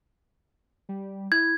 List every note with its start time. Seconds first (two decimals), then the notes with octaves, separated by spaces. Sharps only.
0.89 G3
1.32 E4 G#6